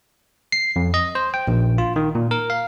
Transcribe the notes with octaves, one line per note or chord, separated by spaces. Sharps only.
C7
F2
D#5
C5
G5
A#1
F4
D#3
A#2
A#4
F5